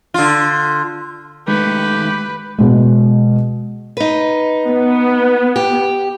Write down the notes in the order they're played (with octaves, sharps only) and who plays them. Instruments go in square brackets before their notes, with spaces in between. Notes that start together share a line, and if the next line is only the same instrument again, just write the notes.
[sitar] D3 F4
[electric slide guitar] D#3 A3 [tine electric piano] G#3 [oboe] G4 [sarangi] B4
[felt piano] B2 G#3
[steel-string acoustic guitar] D#4 B4
[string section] B3
[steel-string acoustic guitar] G4